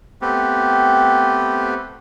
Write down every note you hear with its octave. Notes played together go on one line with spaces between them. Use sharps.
A3 B3 C4 G4